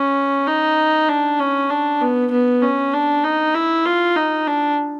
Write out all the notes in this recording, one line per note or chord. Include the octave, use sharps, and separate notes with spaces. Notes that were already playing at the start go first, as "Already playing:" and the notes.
Already playing: C#4
D#4
D4
C#4
D4
B3
B3
C#4
D4
D#4
E4
F4
D#4
D4